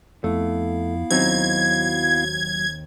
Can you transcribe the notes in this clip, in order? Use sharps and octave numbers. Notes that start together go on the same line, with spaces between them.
F2 A3 B3 E4 F5
D#2 F#3 C4 D#4 G#6